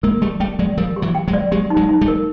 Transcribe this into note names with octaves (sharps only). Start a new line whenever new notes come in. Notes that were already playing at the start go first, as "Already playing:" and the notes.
G#3 A#3 A#4
G3 A3 G4
G3 A3 G5
F#3 G#3 D5
F3 G3 A#4
G4
E3 F#3
G5
F#3 G#3
D5
F#3 G#3 G4
D#4
F#3 G#3
D#4
G3 A3
A#4